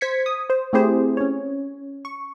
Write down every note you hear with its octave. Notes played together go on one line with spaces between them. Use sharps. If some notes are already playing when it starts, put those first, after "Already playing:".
C5 G#6 B6 C#7
D#6
C5
A3 C4 E4 G4 G#4 C5
C#4 C#5
C#6